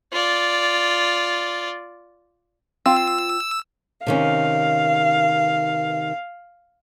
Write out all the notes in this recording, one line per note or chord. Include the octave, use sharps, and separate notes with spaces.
F4 D5
C4 F4 F5 E6
C3 D#3 C#4 F5